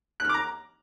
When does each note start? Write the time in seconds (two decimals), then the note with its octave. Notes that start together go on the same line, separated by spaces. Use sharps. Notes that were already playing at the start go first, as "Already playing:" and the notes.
0.20 F#6
0.25 F6
0.29 D6
0.34 A#5